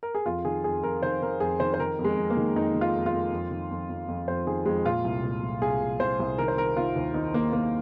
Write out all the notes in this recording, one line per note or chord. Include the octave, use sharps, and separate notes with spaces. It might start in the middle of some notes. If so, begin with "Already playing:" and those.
A#4
G#4
F2 F4
D#3 G#4
F2 G#4
F2 A#4
D#3 C5
D#3 A#4
F2 G#4
D#3 C5
C5
D#3 A#4
F2
G#3
F2
A#3
D#3
F2 D#4
D#3
F4
F2
F4
F2
F2
D#3
F2
F2
F2
F2 C5
D#3 G#4
F2 G#3
A#2 F4
C2
A#2
C2
C2 G#4
A#2
C2 C5
C2
D#3 A#4
C5
D#3 A#4
D#3 F4
D#2
D#3 D#4
D#3 A#3
D#3 A#3